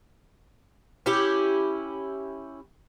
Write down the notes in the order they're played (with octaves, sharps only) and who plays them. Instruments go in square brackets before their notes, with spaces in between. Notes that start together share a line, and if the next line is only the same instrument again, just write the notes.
[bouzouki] C#4 E4 G4